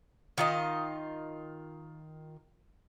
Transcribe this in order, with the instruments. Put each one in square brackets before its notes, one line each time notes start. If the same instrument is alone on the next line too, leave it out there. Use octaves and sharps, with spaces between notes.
[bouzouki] D#3 F4 D#5